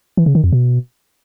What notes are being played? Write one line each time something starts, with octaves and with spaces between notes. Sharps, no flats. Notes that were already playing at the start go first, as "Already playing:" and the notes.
E3
C#3
D#3
F2
B2